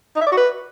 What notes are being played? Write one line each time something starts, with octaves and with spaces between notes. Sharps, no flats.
D#4
E5
D5
F#4
B4